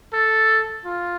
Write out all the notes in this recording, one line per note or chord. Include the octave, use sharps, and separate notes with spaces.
A4
F4